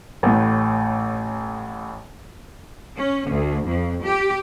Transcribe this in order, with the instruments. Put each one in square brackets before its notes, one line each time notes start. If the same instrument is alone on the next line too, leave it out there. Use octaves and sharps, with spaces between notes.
[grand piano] A1 A2
[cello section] C#4
D2
F2
G4